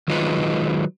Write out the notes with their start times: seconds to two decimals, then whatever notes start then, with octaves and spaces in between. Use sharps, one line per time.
0.08 D#3 F#3 G#3 D#4 F4 B4